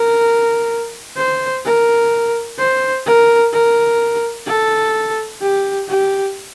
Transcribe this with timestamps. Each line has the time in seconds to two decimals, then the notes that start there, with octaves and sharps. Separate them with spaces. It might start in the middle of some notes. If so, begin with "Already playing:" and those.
Already playing: A#4
1.17 C5
1.65 A#4
2.58 C5
3.06 A#4
3.53 A#4
4.47 A4
5.41 G4
5.88 G4